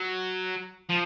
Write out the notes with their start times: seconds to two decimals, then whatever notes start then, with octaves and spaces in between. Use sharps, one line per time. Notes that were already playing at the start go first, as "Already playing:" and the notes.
Already playing: F#3
0.89 F3